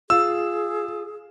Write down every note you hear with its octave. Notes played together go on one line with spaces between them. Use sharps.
F4 G#4 E6